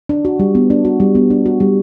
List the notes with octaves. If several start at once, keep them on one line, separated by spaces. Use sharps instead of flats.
D4
F#4
G3
B3
D4
F#4
G3
B3
D4
F#4
G3